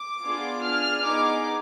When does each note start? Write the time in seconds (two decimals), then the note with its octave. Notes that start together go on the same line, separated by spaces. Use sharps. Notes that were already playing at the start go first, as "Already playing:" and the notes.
Already playing: D6
0.23 B3 D4 F4 G#4
0.64 D4 G#4 F6
1.06 B3 D#4 G#4 D6